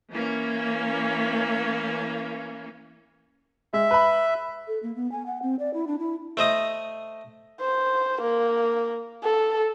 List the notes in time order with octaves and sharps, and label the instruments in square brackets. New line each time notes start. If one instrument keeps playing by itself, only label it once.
[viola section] E3 A#3 C#4
[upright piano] G#3 [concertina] E5
[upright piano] B4 B5
[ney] A4
A#3
B3
G#5
F#5
C4
D5
E4
D4
E4
[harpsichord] A3 C5 D#5 D#6
[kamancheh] C5
A#3
A4